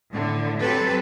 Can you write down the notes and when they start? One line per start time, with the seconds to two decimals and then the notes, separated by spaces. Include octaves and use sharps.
0.13 A2 D3
0.59 F#3 C4 G4 A4 B4